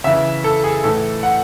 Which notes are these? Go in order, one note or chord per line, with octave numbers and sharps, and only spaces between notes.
C#3 E3 E5
A4
G#4
A2 E3 A4
F#5